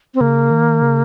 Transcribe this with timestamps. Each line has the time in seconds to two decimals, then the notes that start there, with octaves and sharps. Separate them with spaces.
0.14 C4
0.21 C#3 A#3
0.51 D#3
0.82 C#3